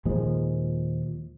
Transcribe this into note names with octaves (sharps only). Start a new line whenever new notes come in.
D#2 A#2 F3 G#3